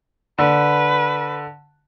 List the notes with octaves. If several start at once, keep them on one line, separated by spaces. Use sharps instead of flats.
D3 B4